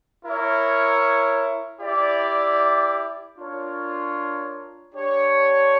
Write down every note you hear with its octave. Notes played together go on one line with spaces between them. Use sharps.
E4 A#4 C#5
E4 G4 D5
D4 F4 A#4 C#5
D4 G4 C#5